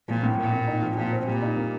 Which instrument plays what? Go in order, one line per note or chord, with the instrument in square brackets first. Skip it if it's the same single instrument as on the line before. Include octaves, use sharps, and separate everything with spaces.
[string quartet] A#2 [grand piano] F3
[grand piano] A2
[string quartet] A#2 [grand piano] A#3
[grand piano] A2
D#4
F3
[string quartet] A#2 [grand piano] F3
[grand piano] C4
[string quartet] A#2 [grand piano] G3
[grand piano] D#4
A#3